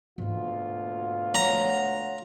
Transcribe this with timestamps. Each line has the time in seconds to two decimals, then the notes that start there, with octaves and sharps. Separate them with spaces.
0.18 D2 G#2 B2 A#3 F4
1.35 G#3 A3 C#5 F#5 A#5